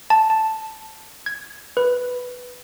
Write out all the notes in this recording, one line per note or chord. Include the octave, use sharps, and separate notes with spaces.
A5
A5
G#6
B4